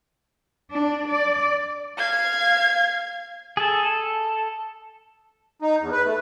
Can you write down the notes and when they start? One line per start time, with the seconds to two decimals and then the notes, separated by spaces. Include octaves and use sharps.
0.71 D4
1.08 D5
1.97 F5 G#6
3.57 G#4 A4
3.83 A4
5.62 D#4
5.80 E2
5.92 B4
6.05 A3